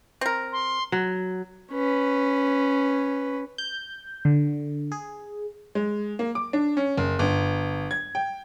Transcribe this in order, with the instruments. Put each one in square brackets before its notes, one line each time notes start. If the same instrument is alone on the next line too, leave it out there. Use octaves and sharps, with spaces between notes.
[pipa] C4 A#4
[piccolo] C6
[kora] F#3
[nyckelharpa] C#4 B4
[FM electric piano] G6
D3
G#4
[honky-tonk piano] G#3
A#3
D6
D4
C#4
F#1
G1
G#6
G5